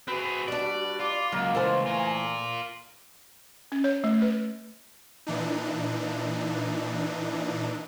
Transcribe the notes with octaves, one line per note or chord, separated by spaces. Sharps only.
C4 F#4 G#4 B4
G3 D4 D5
F4 D6
C#2 F#3 A#3 F5
E3 A3 C5 G#5
F4 A#4
C#4
C#5
A3
B4
A#2 E3 D4 D#4